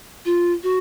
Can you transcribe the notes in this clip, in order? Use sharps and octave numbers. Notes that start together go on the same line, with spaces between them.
F4
F#4